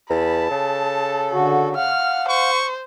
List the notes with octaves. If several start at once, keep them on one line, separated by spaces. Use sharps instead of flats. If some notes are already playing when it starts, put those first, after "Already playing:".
E2 A5 B5
C#3 A4
D3 F#4
F5 F#5 F6
C5 C#6